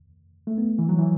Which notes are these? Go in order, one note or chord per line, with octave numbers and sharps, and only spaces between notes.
A3
B3
E3
F#3
E3